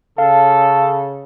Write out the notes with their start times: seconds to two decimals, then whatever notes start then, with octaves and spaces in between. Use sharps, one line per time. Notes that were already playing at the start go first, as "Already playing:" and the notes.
0.18 C#3 A4 F5